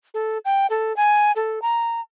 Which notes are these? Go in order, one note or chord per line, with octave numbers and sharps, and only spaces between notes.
A4
G5
A4
G#5
A4
A#5